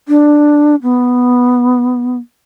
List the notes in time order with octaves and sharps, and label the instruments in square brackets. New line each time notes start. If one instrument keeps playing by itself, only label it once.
[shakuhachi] D4
B3